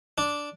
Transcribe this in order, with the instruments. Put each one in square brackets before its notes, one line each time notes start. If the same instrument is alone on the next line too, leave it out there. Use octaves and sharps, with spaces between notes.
[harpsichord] D4